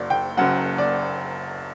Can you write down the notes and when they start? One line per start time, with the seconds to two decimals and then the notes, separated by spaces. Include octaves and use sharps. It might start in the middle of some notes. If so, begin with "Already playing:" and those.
Already playing: F#1 F#2 F#3 D5
0.10 G5
0.37 F#1 F#2 F#3 F#5
0.78 D5